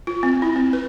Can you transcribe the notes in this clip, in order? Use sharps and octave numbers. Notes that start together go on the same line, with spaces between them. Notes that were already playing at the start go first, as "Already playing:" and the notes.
F4
C4
E4
C4
B4